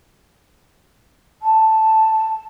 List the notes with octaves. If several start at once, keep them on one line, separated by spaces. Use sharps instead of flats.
A5